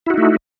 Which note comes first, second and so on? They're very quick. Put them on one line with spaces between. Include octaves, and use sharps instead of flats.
E4 F#4 D#4 A3